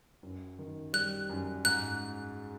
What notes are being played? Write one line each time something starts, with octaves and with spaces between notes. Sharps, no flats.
F#2
D#3
G3 F#6
F#2
G#2 F#6